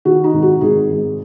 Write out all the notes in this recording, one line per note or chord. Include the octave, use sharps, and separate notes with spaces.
D#3 F#4
D#4
G#1
F#4
G#1 G#4
G#2